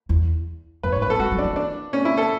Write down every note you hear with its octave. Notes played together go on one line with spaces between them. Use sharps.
E2
F#2 B4
G#2 C#5
B4
F#3 A4
G#3 F#4
F#3
D4
E3
D4
C#4
E4
A4